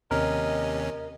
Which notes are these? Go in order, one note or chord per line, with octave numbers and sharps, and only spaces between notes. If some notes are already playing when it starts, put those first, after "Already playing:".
D#2 C3 C#4 A#4 D#5